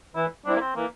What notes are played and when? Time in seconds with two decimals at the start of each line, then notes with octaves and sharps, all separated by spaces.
0.15 E3 E4
0.46 G3 C4 D4 E4
0.56 A#3
0.60 C4
0.75 E3 A#3